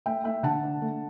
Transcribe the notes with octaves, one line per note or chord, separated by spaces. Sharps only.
A3 E5 G5
A3 E5 G5
D3 F#5 A5
D4
A3